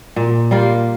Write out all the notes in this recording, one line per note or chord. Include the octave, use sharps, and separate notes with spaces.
A#2
G3 A#3 F4